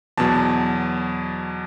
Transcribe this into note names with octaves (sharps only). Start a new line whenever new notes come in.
E2 B2 F#3 A5